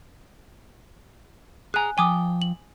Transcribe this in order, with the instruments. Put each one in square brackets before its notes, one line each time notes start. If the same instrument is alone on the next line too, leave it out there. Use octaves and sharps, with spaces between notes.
[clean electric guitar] G#4 A#5 [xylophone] G#5 F#6
[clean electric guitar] F3 G5 [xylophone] G#5 D6 D#6
[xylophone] F#7